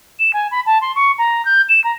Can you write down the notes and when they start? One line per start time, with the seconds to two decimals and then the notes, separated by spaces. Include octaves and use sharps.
0.19 E7
0.33 G#5
0.51 B5
0.66 A5
0.81 C6
0.96 C#6
1.18 A#5
1.45 G6
1.69 E7
1.84 A#5